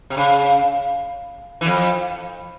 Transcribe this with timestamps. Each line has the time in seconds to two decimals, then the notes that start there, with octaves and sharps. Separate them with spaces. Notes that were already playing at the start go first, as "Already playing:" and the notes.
0.10 C3
0.17 C#3
1.61 E3
1.66 F2